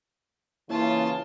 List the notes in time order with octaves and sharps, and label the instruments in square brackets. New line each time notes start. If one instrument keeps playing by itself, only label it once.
[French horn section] C#3 E3 [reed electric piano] A#3 E4 C#5 [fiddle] F4 A5